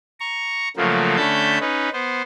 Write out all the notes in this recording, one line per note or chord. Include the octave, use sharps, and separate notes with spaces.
A#5 C#6
C#3 F3 F#3 A3 A#3
D3 A3 C#4 A5 B5 G6
C#4 D#4 B4
B3 C5